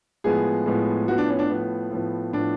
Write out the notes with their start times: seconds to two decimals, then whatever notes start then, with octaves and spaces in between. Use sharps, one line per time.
0.24 A2 F3 G#3 B3 G#4
0.66 A2 F3 G#3 B3
1.08 A2 F3 B3 F#4
1.18 D4
1.29 C#4
1.39 D4
1.49 A2 F3 B3
1.91 A2 F3 B3
2.33 A2 F3 B3 D4